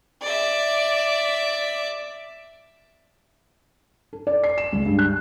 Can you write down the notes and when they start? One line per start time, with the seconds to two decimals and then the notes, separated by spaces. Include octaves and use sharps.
0.22 D5 E5
4.13 A4
4.27 D5
4.44 C7
4.58 E7
4.73 C#2
4.86 G2
4.99 F#6